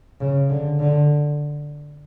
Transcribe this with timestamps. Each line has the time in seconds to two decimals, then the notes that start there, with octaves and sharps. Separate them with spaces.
0.20 C#3
0.49 D3
0.80 D3